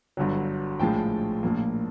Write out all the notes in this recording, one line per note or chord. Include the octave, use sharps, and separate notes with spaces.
G1 G2 D3 F#3
A#1 A2 F3 G#3 G5 A5
A#1 A2 F3 A#3